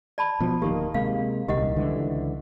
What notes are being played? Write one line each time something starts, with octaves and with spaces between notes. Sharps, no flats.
D5 A5 B5
B2 F3
D1 D#3 A#3 G4
C3 G#3 A#3 F5
D#1 C2 D#3 G4 D#5 F#5
C#2 D3 E3